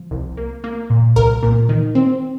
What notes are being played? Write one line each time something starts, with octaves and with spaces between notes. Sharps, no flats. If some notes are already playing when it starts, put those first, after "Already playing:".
Already playing: F3
C2
A#3
A#3
A#2
C2 A#4
A#2
D#3
C4